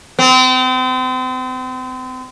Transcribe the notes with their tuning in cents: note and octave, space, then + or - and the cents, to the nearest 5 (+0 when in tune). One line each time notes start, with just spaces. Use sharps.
C4 -35